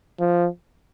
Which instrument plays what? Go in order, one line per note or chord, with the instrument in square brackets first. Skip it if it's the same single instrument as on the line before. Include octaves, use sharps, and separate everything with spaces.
[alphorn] F3